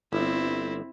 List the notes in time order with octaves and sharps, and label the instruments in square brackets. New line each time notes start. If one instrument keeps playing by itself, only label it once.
[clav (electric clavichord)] G1 [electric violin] C4 E4